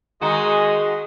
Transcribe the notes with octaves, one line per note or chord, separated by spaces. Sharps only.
D#3 G#3 D#4 F#4 G#4 D#5 C6 D#6